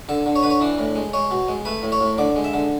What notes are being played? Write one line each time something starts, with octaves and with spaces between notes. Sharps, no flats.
D3 A4
D3
C#5
D3 B4
C#5
E3 D4
A2
G#3
G#3 C#5
B2
G#3
A3 B4
A2
C#5
A2
D3 D5
G#3
E5
D3